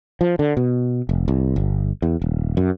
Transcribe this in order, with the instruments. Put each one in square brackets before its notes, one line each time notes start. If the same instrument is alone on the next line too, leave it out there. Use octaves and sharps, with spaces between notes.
[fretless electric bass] F3
D3
B2
F1
C2
G1
E2
D#1
F#2